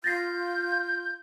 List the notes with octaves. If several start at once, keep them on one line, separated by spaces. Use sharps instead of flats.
F4 G6 A6 A#6 C7